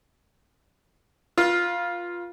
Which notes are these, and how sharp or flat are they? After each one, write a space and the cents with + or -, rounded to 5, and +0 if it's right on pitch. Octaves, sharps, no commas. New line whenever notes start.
F4 +0 B4 -40